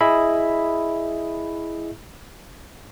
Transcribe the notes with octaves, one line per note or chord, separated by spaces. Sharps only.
E4 G#4 D#5 E5 B5